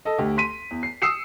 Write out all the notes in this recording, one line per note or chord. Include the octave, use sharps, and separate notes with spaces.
A4 D#5
D2 G4
C6 B6 D#7
E2
C7
D#6 E6 C7 C#7 E7